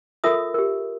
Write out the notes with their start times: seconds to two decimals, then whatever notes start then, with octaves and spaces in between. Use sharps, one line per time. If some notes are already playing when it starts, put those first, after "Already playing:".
0.24 F4 A4 A#4 E5 D#6
0.54 G4 A#4